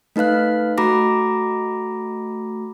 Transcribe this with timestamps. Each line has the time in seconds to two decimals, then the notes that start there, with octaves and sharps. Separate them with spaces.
0.16 A3 D#4 B4 F5 F#6
0.78 A3 F#4 A#5 B5 D6 A#6